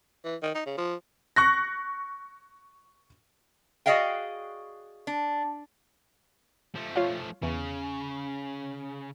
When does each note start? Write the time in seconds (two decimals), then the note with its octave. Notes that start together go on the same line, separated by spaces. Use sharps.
0.24 E3
0.42 D#3
0.55 D#4
0.66 C#3
0.78 F3
1.36 C#6 F#6 A#6
3.86 F#4 G#4 D5 D#5 F5 G5
5.07 D4
6.75 F3 A3
6.96 F4 C#5 F5
7.43 E2 C#3